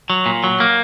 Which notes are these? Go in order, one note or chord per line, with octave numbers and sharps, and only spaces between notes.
F#3
A#2
F#3
A#3